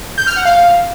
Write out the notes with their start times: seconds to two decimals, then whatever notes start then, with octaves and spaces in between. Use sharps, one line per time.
0.18 G6
0.27 F6
0.36 F#5
0.45 F5